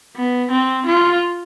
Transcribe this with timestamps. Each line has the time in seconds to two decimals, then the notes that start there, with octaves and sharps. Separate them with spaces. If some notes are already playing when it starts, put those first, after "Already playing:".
0.16 B3
0.51 C4
0.86 F4